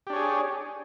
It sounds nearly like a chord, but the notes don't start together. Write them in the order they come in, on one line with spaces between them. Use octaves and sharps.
G4 D4 C#5 G#4